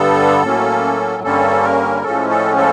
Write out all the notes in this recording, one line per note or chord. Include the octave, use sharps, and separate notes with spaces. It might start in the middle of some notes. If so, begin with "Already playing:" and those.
Already playing: G2 D3 G3 B3 A4
A2 F#3 A#3 C#4
G2 D3 G3 A#3 C#4 A4
A#4
A2 F3 G#3 C#4 A4
A4
A4